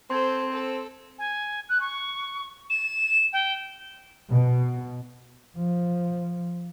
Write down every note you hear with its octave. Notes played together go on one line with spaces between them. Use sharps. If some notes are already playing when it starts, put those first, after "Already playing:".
C4 A4 C5 C6 G#6
A4
G#5
F#6
C#6
E7
G5
B2
F3